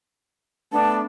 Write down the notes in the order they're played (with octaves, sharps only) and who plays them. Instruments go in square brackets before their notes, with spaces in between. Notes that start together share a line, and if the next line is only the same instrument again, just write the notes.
[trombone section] A3 B3 [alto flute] D4 [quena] A5